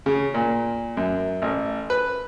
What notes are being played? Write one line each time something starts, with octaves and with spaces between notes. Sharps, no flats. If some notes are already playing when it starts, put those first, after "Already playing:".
C#3
A#2
F#2
A1
B4